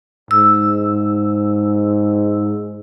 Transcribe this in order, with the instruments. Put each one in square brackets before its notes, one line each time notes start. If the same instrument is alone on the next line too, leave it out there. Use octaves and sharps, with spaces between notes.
[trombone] G#2 [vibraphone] E6